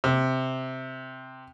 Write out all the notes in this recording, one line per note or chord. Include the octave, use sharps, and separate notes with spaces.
C3